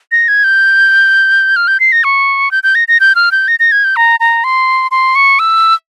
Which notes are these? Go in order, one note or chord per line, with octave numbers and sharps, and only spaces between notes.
A#6
G#6
G6
F6
G6
C7
A#6
C#6
G6
G6
A#6
A#6
G6
F6
G6
A#6
A#6
G#6
G6
A#5
A#5
C6
C6
C#6
E6